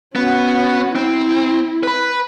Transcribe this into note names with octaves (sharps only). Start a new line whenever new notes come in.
B3 C#4 F#4
C4 E4
B4 B5